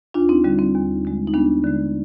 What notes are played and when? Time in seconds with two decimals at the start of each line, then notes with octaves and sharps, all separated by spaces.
0.14 D#2 D4 F4
0.29 C4 D#4
0.44 D3 G3 C4
0.59 C4
0.75 D#2
1.05 D3 G#3
1.28 D#4
1.34 D#2 B3 D4
1.64 D3 G#3